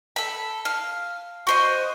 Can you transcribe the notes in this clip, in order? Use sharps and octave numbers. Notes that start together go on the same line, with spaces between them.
A4 B5
F5
F#4 C5 D#5